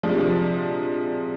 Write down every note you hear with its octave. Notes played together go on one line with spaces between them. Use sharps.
C3 F3 G#3 D4